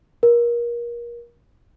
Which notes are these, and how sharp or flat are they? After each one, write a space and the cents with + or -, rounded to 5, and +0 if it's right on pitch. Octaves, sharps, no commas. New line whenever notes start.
A#4 +30